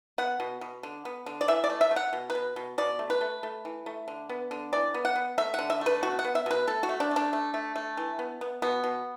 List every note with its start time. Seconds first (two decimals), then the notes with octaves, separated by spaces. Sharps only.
0.18 B3 F#5
0.40 B2
0.61 B2
0.83 D3
1.05 B3
1.26 D3
1.41 D5
1.48 E3 E5
1.64 D5
1.70 A3
1.81 E5
1.91 A3
1.96 F#5
2.13 B2
2.30 B4
2.35 B2
2.56 B2
2.78 B2 D5
2.99 A3
3.10 B4
3.21 A3
3.43 A3
3.65 E3
3.86 A3
4.08 D3
4.29 B3
4.51 D3
4.73 E3 D5
4.94 B3
5.05 F#5
5.16 B3
5.38 A3 E5
5.54 D3 F#5
5.70 E5
5.81 A3 B4
6.03 B2 F#4
6.19 F#5
6.25 B3
6.35 E5
6.46 B2 B4
6.67 A3 A4
6.83 F#4
6.89 A3
7.00 D4
7.11 A3
7.16 D4
7.33 A3
7.54 A3
7.76 A3
7.97 E3
8.19 B3
8.41 B3
8.62 B2 B3
8.84 B2